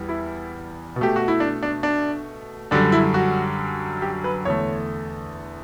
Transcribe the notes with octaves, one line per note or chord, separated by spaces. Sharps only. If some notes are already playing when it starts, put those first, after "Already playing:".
Already playing: E2 E3 G3
E4
B2
A3 G4
F#4
E4
D4
D4
D4
F#2 D3 G3 D4
E4
F#4
G4
B4
E2 D3 A3 C#5